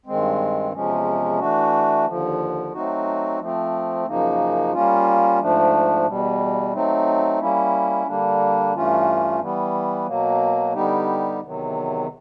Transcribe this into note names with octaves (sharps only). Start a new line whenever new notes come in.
G2 D#3 G#3 C4
E2 C3 F3 G#3 C#4
E3 A3 D4 F#4
D#2 D3 F3
F#3 A3 C4 D#4 F#4
F3 A3 C4
F#2 C#3 F3 A#3 D#4
G3 A#3 C#4 F4
G#2 F3 A3 D4
E2 B2 G3
F#3 A3 C4 D#4
G3 A#3 C#4 E4
D3 G3 A#3 D4
G2 E3 A3 C#4 F4
E3 G3 B3
B2 F#3 A#3
D3 G3 B3 D#4 G4
E2 C3 D#3 F#3